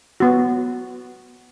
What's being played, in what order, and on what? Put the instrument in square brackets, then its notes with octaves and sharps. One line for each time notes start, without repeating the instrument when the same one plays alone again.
[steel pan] B3 F#4